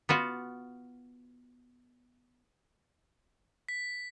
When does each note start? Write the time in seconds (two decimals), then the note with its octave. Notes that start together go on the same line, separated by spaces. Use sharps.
0.09 B3 F4 F#4
3.69 B6